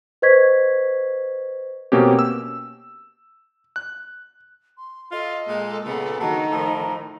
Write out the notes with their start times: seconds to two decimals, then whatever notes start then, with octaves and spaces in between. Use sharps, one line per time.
0.22 B4 C5 D#5 C#6 G#6 B6
1.92 B2 A#3 C4 C#4 G4
2.19 E6
3.76 F#6
4.77 C6
5.12 F4 A4 D#5
5.48 A#2 G#3
5.85 A#2 C#3 B3
6.20 D#3 D4 F#4 A#5
6.52 A2 F3